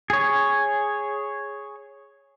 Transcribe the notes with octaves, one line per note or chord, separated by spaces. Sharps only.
G#4 C#5